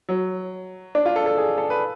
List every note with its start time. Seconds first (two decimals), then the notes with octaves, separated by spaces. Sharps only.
0.09 F#3
0.95 D4
1.06 F4
1.16 A4
1.26 A4
1.38 G#4
1.58 A4
1.70 B4